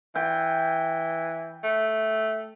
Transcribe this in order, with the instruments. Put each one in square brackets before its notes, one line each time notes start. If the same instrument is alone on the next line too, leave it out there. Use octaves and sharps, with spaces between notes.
[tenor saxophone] E3 [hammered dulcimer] G5
[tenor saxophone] A3